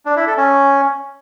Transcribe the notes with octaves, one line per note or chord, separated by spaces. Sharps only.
D4
E4
A4
C#4